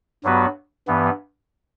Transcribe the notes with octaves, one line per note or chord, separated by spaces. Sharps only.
G2 F#3 B3 F#4 B4
G2 E3 B3